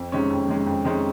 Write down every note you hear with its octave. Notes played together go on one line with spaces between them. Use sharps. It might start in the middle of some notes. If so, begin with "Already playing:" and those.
Already playing: F2
C3 D#3 G#3 C#4
F2
C3 D#3 G#3 C#4
F2
C3 D#3 G#3 C#4